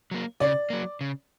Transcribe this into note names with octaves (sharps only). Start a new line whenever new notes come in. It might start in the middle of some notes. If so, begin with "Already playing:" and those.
F#3 A#3
C#3 D5
F#3 A#3
C#3